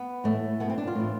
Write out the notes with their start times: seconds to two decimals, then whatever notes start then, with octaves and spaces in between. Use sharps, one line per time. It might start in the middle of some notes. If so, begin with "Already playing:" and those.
Already playing: B3
0.24 A2 E3 A3
0.60 B2 B3
0.70 C4
0.78 D4
0.87 F4
0.95 A2 E3